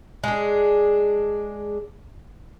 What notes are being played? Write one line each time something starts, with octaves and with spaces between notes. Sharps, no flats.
G#3 D4